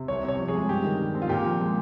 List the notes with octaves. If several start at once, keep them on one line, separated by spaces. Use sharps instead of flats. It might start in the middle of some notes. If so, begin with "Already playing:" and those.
Already playing: C3
C2 C#5
C3 C#5
F3
G#4
G#3
G2 G4
D#3
G3
C4
F4
A#2 G4
F3
G#3